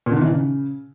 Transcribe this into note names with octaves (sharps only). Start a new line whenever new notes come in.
A#2
D3
D#3
E3
C#3